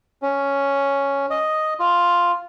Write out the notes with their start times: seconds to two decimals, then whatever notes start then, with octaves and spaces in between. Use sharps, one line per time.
0.22 C#4
1.30 D#5
1.80 F4